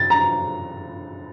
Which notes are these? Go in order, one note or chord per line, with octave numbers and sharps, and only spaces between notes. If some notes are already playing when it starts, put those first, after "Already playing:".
Already playing: A6
A#5